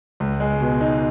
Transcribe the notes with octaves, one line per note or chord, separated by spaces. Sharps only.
C#2
G#3
B2
D#4